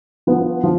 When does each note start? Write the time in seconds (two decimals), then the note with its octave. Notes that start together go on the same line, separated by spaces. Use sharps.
0.27 F3 B3
0.64 F3